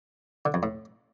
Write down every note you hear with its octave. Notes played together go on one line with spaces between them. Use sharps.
D3
F2
A2